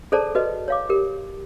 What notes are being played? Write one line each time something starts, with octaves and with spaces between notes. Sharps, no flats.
G#4 A4 C5 D5 A5 A#5
F#4 B4 D#5
C#5 F5 D6
G4 A#4